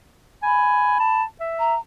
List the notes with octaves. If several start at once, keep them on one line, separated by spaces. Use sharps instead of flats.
G#5 B5
A5
E5
A#5